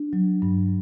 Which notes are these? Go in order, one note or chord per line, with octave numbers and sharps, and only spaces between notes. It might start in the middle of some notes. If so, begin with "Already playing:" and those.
Already playing: D4
F#3
G2